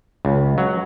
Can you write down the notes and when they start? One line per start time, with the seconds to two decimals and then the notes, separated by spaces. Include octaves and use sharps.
0.25 C#2
0.58 F#3